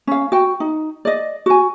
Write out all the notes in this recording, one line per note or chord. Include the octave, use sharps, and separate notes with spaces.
C#4 F5
F#4 G5
D#4
D5 D#5
F#4 G#5